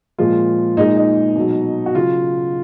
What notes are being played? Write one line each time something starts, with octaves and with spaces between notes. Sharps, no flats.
A#2 F3 G#3 F4
A#2 G#3 D#4
D#4
B2 F#3
F#4
C#3 F#3 F4